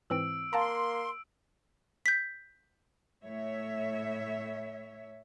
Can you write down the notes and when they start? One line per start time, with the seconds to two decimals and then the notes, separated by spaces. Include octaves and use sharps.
0.10 G#2 E3 C4 E6 D7
0.53 A#3 F5 A5 A#5 C6
2.06 G6 B6
3.25 A2 C#5 E5